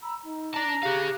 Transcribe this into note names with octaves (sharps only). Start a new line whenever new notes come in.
A#5 B5 E6
D#4
D4 A5 A#5
G4 G#4 F5 F#6